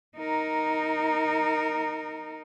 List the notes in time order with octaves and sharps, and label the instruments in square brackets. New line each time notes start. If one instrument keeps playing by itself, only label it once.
[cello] D#4 A#4